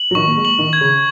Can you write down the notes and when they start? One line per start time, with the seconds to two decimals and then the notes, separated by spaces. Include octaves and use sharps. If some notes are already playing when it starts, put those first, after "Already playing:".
Already playing: F#7
0.11 F#3
0.15 D#3 C#6
0.27 A#3
0.37 G#3
0.45 F#7
0.59 D#3
0.73 G#6
0.81 C#3